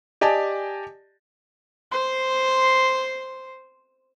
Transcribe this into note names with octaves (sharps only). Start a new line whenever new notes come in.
G4 D5 D#5 G#5 A5
C5 C6